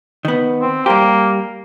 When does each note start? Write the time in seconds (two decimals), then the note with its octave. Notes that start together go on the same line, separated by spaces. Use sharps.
0.25 D#3 B3
0.62 C4
0.86 G3 A#3 G4